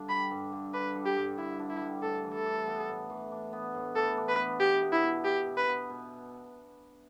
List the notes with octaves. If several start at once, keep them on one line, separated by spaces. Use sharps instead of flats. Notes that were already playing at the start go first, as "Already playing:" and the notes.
Already playing: G2 D3 D4
G3 B5
G2
D3
D4 B4
G3
G4
G2
D3 E4
D4
E4
G3
A2 A4
E3
A4
D4
B3
A2
E3
D4
B3
A2
E3 A4
D4
B4
B3
B2 G4
B3
E4
B2
E4 G4
B2
B4
B3
B2